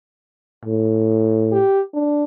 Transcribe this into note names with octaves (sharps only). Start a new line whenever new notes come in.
A2
G4
D4